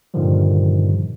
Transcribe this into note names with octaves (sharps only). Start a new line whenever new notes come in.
G2 A#2 D3 D#3 F3 G3